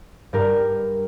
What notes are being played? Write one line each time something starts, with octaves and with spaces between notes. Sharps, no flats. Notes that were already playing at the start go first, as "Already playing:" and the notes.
G2 G4 A#4